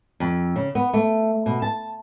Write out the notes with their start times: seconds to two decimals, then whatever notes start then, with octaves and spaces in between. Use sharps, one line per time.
0.20 F2
0.56 C#3
0.75 B3
0.93 A3
1.46 B2
1.62 A5